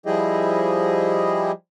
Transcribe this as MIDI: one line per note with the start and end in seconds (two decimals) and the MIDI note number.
0.06 1.52 53
0.06 1.52 55
0.06 1.52 64
0.06 1.52 67
0.06 1.52 68
0.06 1.52 75